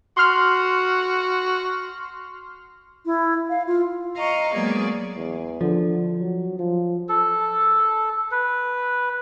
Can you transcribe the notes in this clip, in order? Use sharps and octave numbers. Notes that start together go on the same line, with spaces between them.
F#4 C6 F6
E4
F5
F4
D#5 F5 A#5 C#6
F#3 G#3 A#3 B3 G#4 D5
E2
D3 F3
F#3
F3
A4
B4